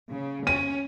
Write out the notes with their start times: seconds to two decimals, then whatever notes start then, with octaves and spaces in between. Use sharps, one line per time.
0.11 C#3
0.47 C#4 D#7